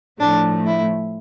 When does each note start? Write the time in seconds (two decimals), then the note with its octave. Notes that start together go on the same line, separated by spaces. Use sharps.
0.20 A2 F3 A3 D4
0.66 E4